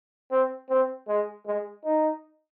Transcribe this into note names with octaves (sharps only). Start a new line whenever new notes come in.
C4
C4
G#3
G#3
D#4